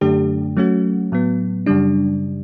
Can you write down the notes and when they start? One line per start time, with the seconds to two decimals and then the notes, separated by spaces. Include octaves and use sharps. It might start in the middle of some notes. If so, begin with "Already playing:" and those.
0.01 F#2 D3 A3 D4 G4
0.57 F#3 A3 C#4 F#4
1.12 A2 F#3 B3
1.66 F#2 C#3 G3 D4